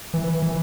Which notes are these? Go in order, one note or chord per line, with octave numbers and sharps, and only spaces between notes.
E3
E3